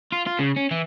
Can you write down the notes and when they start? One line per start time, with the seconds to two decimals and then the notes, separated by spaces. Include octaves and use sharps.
0.12 F4
0.27 F4
0.39 C#3
0.56 C#4
0.71 E3